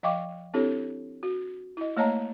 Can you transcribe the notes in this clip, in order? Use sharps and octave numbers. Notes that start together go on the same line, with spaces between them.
F3 D#5 F5 G5 C#6 D6
C4 D4 E4 G4 A4 C#5
F#4
E4 D#5
A3 A#3 C#5 D#5 A5 A#5